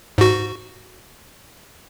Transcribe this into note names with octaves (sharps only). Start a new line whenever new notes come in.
G#2 F#4